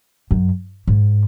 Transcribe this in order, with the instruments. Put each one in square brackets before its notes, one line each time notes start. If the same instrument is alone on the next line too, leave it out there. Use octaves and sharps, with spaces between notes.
[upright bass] F#2
G#2